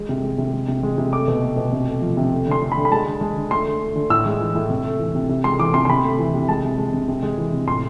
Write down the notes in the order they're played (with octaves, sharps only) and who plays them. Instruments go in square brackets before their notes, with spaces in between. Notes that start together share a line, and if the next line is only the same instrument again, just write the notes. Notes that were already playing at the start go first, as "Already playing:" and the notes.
Already playing: [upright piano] G#3
C3
G#3
C3
G#3
C3
G#3
C3
A3 D6
B2
A3
B2
C3
A3
F3
C3
A3
D3 C6
A3
B5
D3
B5
G#3 A5
D3
G#3
D3
A3 C6
D3
A3
D3
A2 E6
G#3
E3
A2
C3
A3
E3
C3
C3
G#3 C6
E3 D6
C3 C6
C6
C3 B5
A3
E3
C3
G#3 A5
C3
G#3
C3
C3
G#3
E3
C3
A2 C6